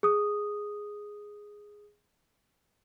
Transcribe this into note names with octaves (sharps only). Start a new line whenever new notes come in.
G#4 D#6